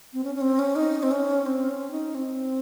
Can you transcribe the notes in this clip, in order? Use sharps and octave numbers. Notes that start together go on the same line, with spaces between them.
C4
C#4
C#4
C4
C#4
D#4
C4
C#4
C4
C#4
D#4
C4